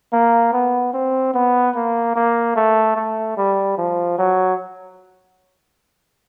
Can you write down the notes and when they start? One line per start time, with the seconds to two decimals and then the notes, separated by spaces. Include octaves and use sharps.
0.13 A#3
0.53 B3
0.94 C4
1.34 B3
1.75 A#3
2.15 A#3
2.56 A3
2.96 A3
3.37 G3
3.77 F3
4.18 F#3